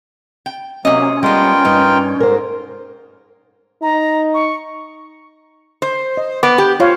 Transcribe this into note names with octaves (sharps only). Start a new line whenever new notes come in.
G5
C3 F#3 A#3 C#4 D#5
G3 G#3 B3 F4 A#4 G5
G2 D#4
G#2 A#4 C5
D#4 A#5
C#6
C5
D#5
B3 D6
G4
F4 C5 C#5 F5